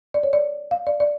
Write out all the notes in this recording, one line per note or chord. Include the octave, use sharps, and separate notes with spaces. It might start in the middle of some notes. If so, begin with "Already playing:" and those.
D5
C#5
D5
F5
D5
D5